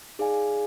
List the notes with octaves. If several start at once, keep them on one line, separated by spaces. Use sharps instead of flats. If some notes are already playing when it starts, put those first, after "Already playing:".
D#4 G#4 D5 F5 G#5